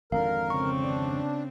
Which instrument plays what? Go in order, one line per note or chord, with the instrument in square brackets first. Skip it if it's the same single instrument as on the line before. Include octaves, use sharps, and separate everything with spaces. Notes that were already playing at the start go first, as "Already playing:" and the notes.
[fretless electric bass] G#1 F2 D3 [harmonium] A#4 [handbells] F5
[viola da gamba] C#3 C4 [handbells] C#6
[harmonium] D4